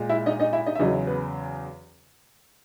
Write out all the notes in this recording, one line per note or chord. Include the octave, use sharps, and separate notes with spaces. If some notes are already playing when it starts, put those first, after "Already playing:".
Already playing: A#2 G#3
E4 E5
D#4 D#5
D#4 D#5
E4 E5
D#4 D#5
E5
E2 C#3 F#3 D#4 D#5
B3 B4